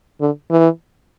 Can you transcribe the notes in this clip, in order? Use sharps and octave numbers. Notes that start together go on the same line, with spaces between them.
D3
E3